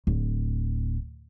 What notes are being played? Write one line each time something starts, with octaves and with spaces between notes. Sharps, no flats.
D1